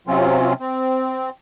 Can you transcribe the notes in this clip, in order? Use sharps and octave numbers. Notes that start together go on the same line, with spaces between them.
C3 F#3 C4 C#4 F4
C4